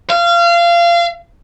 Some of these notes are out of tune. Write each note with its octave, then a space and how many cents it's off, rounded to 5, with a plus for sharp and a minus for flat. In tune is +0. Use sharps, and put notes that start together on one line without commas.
F5 -25